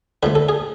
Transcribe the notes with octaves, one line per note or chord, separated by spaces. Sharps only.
D3 F3 A3 B4
A4
G#4